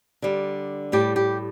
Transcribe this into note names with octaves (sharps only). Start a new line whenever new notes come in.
D3 G3
A2 G3 G4
G4